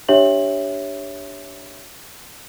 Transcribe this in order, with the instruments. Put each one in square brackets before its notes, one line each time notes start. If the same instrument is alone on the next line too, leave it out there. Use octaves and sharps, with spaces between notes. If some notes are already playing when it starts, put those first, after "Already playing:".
[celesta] D4 G4 C#5 E5 F#7